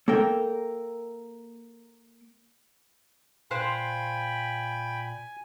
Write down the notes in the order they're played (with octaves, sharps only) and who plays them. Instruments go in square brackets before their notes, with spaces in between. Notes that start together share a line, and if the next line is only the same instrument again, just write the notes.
[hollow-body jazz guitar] A#3 A4 A#4 G5
[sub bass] A#2 [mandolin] C5 F5 F#6 [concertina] G5 B5 [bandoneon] G#5